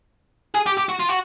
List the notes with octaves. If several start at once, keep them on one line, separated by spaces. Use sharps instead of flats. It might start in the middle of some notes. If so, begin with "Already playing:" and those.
G#4
G4
G4
F#4
F4
F#4